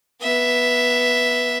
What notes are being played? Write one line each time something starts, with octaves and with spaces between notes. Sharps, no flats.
B3 E5